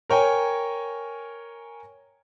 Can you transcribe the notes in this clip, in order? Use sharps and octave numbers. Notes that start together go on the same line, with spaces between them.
A#4 C#5 G5 G#5